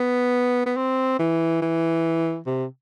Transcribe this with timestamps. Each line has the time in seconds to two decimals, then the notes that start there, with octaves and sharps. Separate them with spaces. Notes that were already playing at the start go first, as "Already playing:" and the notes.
Already playing: B3
0.66 B3
0.77 C4
1.19 E3
1.62 E3
2.46 C3